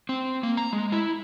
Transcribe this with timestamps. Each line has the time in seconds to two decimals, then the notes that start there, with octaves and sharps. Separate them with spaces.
0.09 C4
0.43 A#3
0.57 A#5
0.73 G#3
0.92 E4